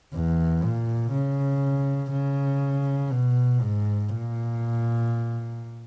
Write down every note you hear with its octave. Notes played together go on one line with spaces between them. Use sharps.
E2
A#2
C#3
C#3
B2
G#2
A#2